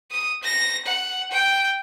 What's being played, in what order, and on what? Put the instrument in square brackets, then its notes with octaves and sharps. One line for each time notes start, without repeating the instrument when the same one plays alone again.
[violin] D#6
A#6
F#5
G5